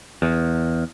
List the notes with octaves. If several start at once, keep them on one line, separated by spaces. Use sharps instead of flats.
E2